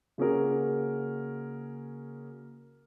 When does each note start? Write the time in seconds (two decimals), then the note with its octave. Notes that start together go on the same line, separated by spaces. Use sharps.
0.18 C#3 A#3 C#4 F#4 G#4 A#4